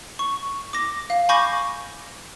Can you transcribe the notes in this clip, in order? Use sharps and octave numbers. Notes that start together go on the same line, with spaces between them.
C#6
D6 A#6
F5
G#5 B5 C#6 D6 G6 A#6